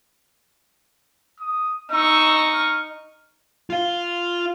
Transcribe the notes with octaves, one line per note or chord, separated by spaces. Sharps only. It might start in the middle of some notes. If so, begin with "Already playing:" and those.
D#6
D#4 C#6 E6
F6
F4 F5